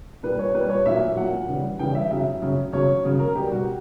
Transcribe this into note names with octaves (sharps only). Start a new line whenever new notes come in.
A#2 G3 B4
C#5
A#2 G3 B4
C#5
A#2 F#3 E5
A#2 F#3 F#5
C#3 E3 G3
C#3 E3 G3 G5
E5
C#3 F#3 E5
C#3 F#3
C#3 F#3 C#5
C#3 F#3
A#4
B2 G3 G4
F#4